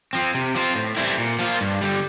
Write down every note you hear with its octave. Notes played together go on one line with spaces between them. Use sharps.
F3 C4
C3
F3 C4 F4
A2
E3 G3 C4 E4
A#2
F3 A#3 F4
G2
D3 G3